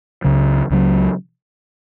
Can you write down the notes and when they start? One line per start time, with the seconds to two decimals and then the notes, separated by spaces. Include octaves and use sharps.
0.24 C#2 C#3 F#3
0.70 C#2 C#3 F#3